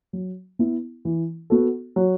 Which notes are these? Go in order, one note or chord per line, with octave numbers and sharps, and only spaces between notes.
F#3
B3 E4
E3
B3 F#4 A4
F#3